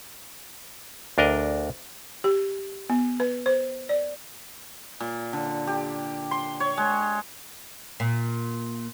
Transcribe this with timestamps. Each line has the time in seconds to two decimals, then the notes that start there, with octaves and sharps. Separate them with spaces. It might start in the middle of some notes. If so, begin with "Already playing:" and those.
1.18 D2 D4 A#4 D#5
2.24 G4
2.90 B3
3.20 B4
3.46 C5
3.89 D5
5.00 A#2
5.33 D3
5.67 G4
6.31 C6
6.60 C#5
6.77 G#3
8.00 A#2